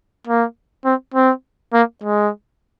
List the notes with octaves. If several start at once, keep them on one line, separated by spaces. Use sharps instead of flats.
A#3
C4
C4
A#3
G#3